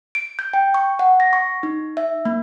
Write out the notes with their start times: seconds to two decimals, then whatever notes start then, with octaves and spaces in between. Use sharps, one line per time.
0.15 D7
0.39 G6
0.53 G5
0.74 C#6
0.99 F#5
1.20 A#6
1.33 C#6
1.63 D#4
1.97 E5
2.25 A#3